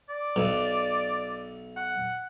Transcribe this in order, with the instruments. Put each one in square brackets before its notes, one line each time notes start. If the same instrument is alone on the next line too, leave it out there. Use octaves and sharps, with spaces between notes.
[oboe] D5
[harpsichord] B1
[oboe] F#5